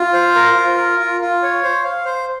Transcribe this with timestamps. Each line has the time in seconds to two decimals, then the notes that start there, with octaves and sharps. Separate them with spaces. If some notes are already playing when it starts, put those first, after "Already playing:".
Already playing: F4
0.13 C5
0.35 A#4
0.56 F4
0.77 A#4
0.99 F4
1.21 F4
1.42 C#5
1.63 C5
1.84 F5
2.05 C5